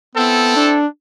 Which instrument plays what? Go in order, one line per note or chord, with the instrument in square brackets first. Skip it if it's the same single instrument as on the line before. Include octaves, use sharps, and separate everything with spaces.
[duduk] B3 [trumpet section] C4 E4 A4
[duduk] D4